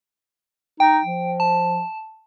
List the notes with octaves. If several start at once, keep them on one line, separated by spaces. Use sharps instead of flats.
D#4 G5
F3
A5